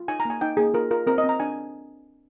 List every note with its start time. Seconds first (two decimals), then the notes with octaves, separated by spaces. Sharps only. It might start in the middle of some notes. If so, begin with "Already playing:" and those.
Already playing: F4
0.08 D#4 G#5
0.20 A#5
0.25 A#3 G#5
0.41 D#4 G5
0.57 A#3 G#4
0.74 F4 A#4
0.91 F4 A#4
1.07 C4 A#4
1.18 D#5
1.24 C4
1.29 A#5
1.40 D4 G#5